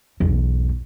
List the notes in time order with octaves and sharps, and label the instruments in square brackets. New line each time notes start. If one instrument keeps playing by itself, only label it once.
[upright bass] B1 E2